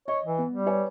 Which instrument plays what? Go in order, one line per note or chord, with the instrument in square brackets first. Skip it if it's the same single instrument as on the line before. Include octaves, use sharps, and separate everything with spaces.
[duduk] C#5 [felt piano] D#5
[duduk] E3
[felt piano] B3
[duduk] G3
[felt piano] B4 C#5 G#5